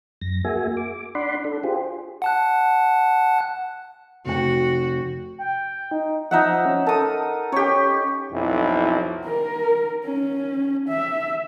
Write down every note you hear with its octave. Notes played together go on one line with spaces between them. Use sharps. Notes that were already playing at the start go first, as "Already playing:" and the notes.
F#2 A#6
A#3 F#4 G#4 E5 G#5
D6
D4 D5 F#5 B5 C6
D4 A4
F4 G4 G#4 C5
F#5 A5 F#6
F1 F#4 G5
G5
D#4
F3 D#4 E5 F#5
C#4
A4 A#4 D#6
C#4 G4 C#5
B1 F2 E4
A#4
C#4
E5